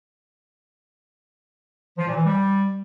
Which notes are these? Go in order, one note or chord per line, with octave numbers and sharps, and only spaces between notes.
F3
A#2
E3
G3